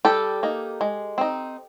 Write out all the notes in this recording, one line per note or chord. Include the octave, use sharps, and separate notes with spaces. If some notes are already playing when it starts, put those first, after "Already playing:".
G3 G4 A4
A#3 D#4
G#3
C4 D#4